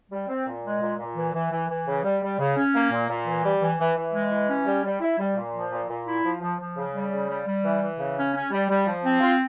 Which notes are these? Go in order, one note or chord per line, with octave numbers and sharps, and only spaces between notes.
G3
C4
A#2
G#3
A#2
A#2
E3
E3
E3
E3
C#3
G3
G3
C#3
C#4
A#3
A#2
A#2
E3
G3
E3
E3
E3
G#3
E3
C#4
G3
G3
E4
G3
A#2
F3
A#2
A#2
E4
F3
F3
F3
C#3
G3
C#3
G3
G3
E3
E3
C#3
C#4
C#4
G3
G3
F3
C4
F4